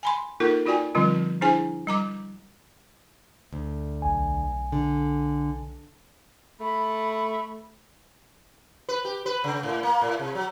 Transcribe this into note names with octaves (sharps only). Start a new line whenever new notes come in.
G#5 B5 C6
A#3 D#4 F4 A4 A#4 C#6
D#4 F4 F#4 D5 G5 G#5
D3 F3 G3 C4 F4
D4 E4 G#4 C5 G#5
G3 A#5 D6
D2
B1 G#5
D3
A3 B5
B4
G4
B4
C#3
A2
A#3
A2
C3
F#3